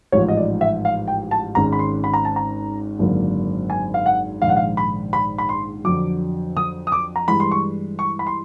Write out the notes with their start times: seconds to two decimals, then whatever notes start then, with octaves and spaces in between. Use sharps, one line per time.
0.12 A1 G#2 F3 C#5
0.28 D#5
0.37 D5
0.61 E5
0.85 F5
1.08 G5
1.31 A5
1.55 G#1 G#2 D#3 G#3 C#4 A#5
1.72 B5
1.79 C6
2.04 B5
2.14 A#5
2.25 A5
2.36 A#5
2.99 G#1 F#2 D3 F#3 A#3
3.70 G#5
3.94 F5
4.06 F#5
4.42 A#1 G#2 D#3 F5
4.49 F#5
4.57 F5
4.77 B5
5.13 B5
5.38 B5
5.49 C6
5.84 F2 D3 F#3 D6
6.57 D#6
6.87 D#6
6.92 D6
7.16 A#5
7.28 G2 E3 G#3 B5
7.40 C6
7.51 C#6
7.99 C#6
8.19 B5
8.27 C6